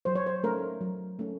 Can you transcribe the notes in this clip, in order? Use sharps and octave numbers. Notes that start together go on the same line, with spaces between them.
F#3 C5
C#5
C5
A3 C#4 A#4
F#3
A3 C#4